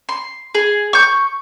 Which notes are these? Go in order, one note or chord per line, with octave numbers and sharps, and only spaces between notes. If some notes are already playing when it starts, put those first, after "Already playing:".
C6
G#4
C#6 G6